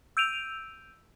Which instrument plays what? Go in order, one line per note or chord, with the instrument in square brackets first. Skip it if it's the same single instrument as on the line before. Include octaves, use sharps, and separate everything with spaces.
[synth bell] E6 G6 D7 D#7 F7